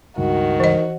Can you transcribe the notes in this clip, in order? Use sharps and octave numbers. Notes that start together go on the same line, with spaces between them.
C#2 G2 D#3 F#4
E3 D#5